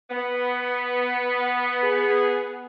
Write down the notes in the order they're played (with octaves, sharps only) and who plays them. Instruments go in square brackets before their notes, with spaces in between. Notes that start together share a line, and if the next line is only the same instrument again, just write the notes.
[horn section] B3
[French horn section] G#4